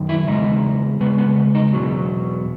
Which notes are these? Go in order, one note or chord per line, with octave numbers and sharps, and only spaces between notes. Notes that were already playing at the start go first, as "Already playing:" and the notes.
Already playing: F#2 D#3
E4
E2 C#3 G#3 D#4
E2 C#3 G#3 B3
B3
B3
D#4
E2 B2 F#3